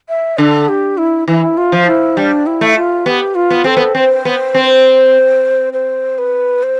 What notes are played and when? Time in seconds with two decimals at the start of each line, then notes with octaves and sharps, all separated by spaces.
0.09 E5
0.38 D3 A4
0.68 G4
0.98 E4
1.28 E3 E4
1.57 F4
1.72 F3
1.86 E4
2.17 G3 D4
2.46 E4
2.61 A3
2.76 F4
3.06 B3 G4
3.35 F4
3.50 B3
3.64 C4 A4
3.77 B3
3.95 C4 C5
4.25 B3
4.54 C4
5.73 C5
6.18 B4
6.63 C5